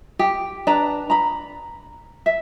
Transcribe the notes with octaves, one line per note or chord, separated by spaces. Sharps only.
G4
D4 B4 A#5
A#5 B5
E5